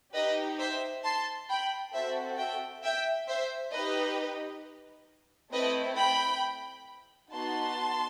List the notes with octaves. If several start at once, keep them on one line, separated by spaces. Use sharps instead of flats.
D#4 G4 B4 D#5
C5 E5
A5 C6
G5 B5
C4 F#4 A4 C5 E5
E5 G5
E5 G5
C5 E5
D#4 G4 B4 D#5
A3 C4 E4 B4 D#5
G5 B5
B3 D#4 F#4 A5 C6